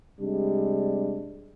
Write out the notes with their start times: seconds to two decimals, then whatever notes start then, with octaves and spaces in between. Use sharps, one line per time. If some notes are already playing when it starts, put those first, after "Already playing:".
0.20 C3 G3 G#3 D4